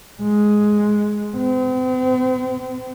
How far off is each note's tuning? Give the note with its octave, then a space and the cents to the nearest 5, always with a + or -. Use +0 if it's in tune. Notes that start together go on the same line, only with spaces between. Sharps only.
G#3 +5
C4 -40